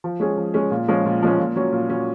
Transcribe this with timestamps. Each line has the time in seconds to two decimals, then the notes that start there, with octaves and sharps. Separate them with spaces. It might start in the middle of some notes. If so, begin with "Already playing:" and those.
0.04 F3
0.20 G#3 C#4 G#4
0.37 F3
0.54 G#3 C#4 G#4
0.71 A#2
0.88 F3 G#3 C#4
1.05 A#2
1.23 F3 G#3 C#4
1.39 A#2
1.56 F#3 C#4
1.73 A#2
1.89 F#3 C#4